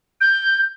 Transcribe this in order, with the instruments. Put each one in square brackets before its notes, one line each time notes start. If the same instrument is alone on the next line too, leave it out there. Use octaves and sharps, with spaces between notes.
[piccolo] G6